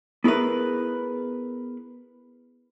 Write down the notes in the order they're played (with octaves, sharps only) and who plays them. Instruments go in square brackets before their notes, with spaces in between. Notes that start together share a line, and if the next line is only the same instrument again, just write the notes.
[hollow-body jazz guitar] B3 E4 G#4 A#4 B4